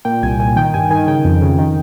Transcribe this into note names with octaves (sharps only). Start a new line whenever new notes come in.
A#2 G5
C2 G#5
A#2 G#5
D#3 G5
G2 G#5
D#3 G#5
C#3 G5
F2
C#3
D#3